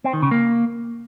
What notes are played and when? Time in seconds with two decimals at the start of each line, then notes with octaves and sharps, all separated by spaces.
0.04 C4
0.13 D#3
0.22 C#3
0.31 A#3